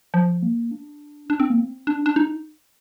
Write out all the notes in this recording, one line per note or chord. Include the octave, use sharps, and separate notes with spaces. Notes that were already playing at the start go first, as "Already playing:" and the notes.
F3
A#3
D4
D4
C4
A#3
C4
D4
D4
D#4